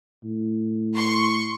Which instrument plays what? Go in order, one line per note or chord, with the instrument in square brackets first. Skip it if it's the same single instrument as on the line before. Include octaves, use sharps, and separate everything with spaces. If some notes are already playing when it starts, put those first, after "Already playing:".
[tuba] A2
[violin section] C6 C#6